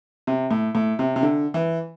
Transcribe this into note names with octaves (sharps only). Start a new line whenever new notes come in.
C3
A2
A2
C3
C3
D3
E3